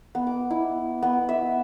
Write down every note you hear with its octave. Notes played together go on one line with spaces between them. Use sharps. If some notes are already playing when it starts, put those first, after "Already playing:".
B3
D6
E4
B3
E5